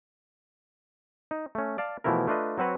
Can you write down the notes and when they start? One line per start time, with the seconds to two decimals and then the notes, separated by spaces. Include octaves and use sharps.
1.31 D#4
1.55 A3 C#4
1.78 D5 F5 A5
2.04 B2 E3 F3 A3 E4 A#4
2.28 A3 D4 F4 B4 D#5
2.58 F#3 C4 F#4 B4 C#5